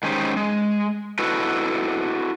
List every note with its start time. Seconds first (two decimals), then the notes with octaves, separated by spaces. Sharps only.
0.03 D#3 G#3 C#4 D#4 G4 C5
0.36 G#3
1.19 E4 F#4 A4 B4 D#5